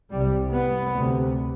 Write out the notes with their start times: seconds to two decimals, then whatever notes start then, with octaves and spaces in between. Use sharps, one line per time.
0.12 C2 C3 G3
0.53 B3
0.95 D2 C3